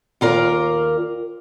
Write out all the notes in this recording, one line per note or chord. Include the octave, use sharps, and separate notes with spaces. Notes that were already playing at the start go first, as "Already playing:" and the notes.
D#2 F4 A#4 D5